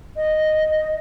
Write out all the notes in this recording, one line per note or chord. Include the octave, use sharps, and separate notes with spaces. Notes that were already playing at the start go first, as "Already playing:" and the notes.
D#5